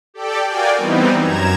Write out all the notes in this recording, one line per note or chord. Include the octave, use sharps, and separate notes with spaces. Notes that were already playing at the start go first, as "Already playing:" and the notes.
G4 A4 D5 G5
F#4 A#4 D5 F5 G5 G#5
E3 G3 B3 C4 D#4
F#2 A#5 G#6 E7